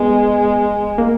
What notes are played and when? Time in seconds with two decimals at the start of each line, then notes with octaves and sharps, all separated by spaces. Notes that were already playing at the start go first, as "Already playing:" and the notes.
Already playing: G#3 B3
0.98 A#3